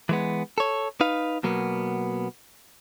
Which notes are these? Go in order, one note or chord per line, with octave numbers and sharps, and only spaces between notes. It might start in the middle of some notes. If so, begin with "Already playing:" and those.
E3 G#3 B3
A4 C#5
D#4 B4 F5
B2 F#3 A#3 B3